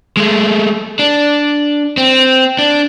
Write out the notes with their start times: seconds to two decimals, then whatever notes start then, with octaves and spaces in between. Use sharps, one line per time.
0.17 G#3 A3
0.99 D4
1.97 C4
2.59 D4